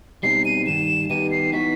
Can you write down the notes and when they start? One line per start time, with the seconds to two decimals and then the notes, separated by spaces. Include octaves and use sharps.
0.23 B2 G3 C4 D#4 C7
0.45 D#7
0.66 G2 D#3 G3 E7
1.09 D#3 G3 B3 D#4 G4 D#7
1.31 C7
1.52 E3 B3 D#4 F#4 B6